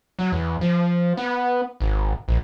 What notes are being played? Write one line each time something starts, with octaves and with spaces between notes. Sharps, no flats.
F#3
E2
F3
B3
G#1
A#1